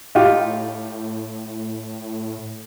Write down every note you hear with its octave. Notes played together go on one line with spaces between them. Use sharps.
A2 D#4 F4 G4